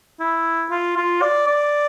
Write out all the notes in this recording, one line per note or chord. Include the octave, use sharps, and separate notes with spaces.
E4
F4
F4
D5
D5